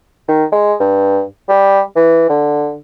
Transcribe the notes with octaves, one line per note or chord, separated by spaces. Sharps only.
D#3
G#3
G2
G3
E3
D3